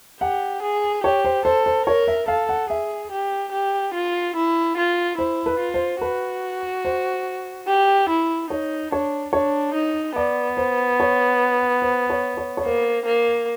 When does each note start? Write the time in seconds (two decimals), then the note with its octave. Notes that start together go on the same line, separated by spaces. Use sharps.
0.20 G4 F#5
0.63 G#4
1.04 G4 C#5
1.25 C5
1.45 A4 C5
1.66 C5
1.86 A#4 C#5
2.08 E5
2.28 A4 F5
2.49 F#5
2.70 G#4 E5
3.12 G4
3.52 G4
3.95 F4
4.36 E4
4.78 F4
5.18 E4 C5
5.46 B4
5.60 F4
5.74 C5
6.01 F#4 B4
6.85 C5
7.67 G4
8.09 E4
8.50 D#4 C#5
8.92 D4 C#5
9.33 D4 C#5
9.74 D#4
10.16 B3 D5
10.57 C5
11.00 C#5
11.82 C5
12.10 C#5
12.37 C#5
12.57 C#5
12.64 A#3 C5
13.06 A#3